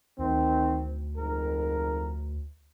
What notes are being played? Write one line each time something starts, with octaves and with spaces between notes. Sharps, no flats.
D2 D#3 C4
F2 G#2 A#4